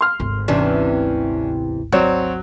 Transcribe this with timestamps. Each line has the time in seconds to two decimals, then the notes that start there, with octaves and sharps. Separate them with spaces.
0.01 C6 F6
0.20 G#1 D2
0.48 E2 C3 E3 C#4 D4
1.92 F#3 C4 F#4 C#5 D5